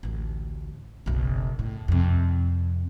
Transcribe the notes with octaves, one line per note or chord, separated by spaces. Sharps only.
A1 D2
F#1 B1
A2
F2 C3